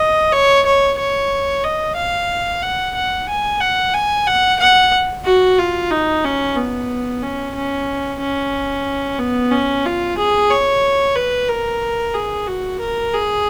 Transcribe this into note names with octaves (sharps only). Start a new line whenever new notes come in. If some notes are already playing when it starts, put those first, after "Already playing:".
Already playing: D#5
C#5
C#5
C#5
D#5
F5
F#5
F#5
G#5
F#5
G#5
F#5
F#5
F#4
F4
D#4
C#4
B3
C#4
C#4
C#4
B3
C#4
F4
G#4
C#5
B4
A#4
G#4
F#4
A#4
G#4